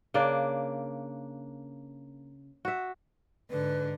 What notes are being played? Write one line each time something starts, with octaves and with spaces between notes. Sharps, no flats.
C#3 A#3 D4 D5
F#4 E5
G#2 D3 B4